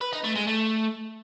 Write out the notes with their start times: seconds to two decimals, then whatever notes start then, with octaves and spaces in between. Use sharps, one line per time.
0.01 B4
0.13 D#4
0.24 A3
0.36 G#3
0.47 A3